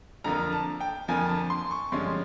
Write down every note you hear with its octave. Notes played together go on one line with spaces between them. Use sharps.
F2 D3 F3 A#3 A#5
A5
G5
F2 D3 F3 A#3 G#5
A5
C6
C#6
G2 D3 F3 G#3 C#4 C6